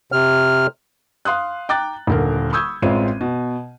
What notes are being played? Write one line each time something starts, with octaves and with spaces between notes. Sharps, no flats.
C3 F6
F5 C6 D#6 F#6
G5 A#5 D6 F#6 A6
D#1 D3 A#4
B5 C#6 D#6 E6 G6 G#6
A1 G#3 C4 F4 C#5 D#7
B2